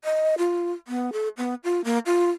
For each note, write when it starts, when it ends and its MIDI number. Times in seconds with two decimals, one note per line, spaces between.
0.04 0.35 75
0.38 0.71 65
0.88 1.10 59
1.13 1.28 69
1.37 1.55 59
1.64 1.81 65
1.84 1.99 58
2.06 2.30 65